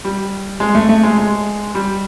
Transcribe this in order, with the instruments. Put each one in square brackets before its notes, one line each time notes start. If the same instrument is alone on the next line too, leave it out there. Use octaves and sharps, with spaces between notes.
[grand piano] G3
G#3
A3
A3
G#3
G#3
G3